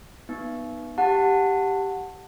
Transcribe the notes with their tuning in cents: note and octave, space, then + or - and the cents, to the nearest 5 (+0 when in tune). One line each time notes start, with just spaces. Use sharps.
B3 -10 D#4 -15
G4 +0 F#5 -10 A5 +20